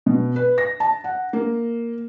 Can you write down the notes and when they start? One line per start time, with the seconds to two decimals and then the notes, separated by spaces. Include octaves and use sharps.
0.06 B2
0.36 B4
0.58 A#6
0.80 A5
1.04 F#5
1.33 A#3